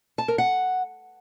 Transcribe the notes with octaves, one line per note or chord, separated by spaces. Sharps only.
A5
A#4
F#5